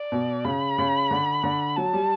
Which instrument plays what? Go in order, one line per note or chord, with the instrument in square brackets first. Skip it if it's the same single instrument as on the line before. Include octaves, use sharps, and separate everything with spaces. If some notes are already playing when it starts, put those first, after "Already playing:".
Already playing: [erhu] D5
[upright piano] B2
[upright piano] C#3 [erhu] B5
[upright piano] C#3
D3
D3
[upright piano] F#3 [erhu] A5
[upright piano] G3